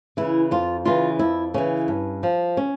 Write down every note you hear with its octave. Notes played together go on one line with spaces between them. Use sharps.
C#3 E3 E4
F2 F4
C#3 E3 F4
F2 E4
C#3 E3 C#4
G2
F3
C#4